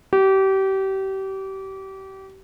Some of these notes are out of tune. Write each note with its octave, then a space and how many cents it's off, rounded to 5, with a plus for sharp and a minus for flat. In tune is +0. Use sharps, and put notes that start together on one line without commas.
G4 -30